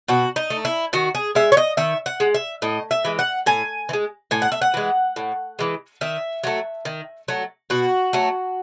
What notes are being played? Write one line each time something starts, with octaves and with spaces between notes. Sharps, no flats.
B2 F#4
D#4
A3
E4
D#3 F#4
G#4
G#3 E5
C#5
D#5
D#3 E5
F#5
G#3
E5
A2 D#5
E5
E3 G#3
F#5
A2 G#5
E3
G#3
A2 G#5
F#5
E5
F#5
E3 G#3
A2
E3 G#3
D#3 E5
F#3 A3
D#3
F#3 A3
B2 F#4
F#3 A3